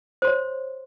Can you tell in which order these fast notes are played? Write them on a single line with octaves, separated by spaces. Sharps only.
C5 C6 C#5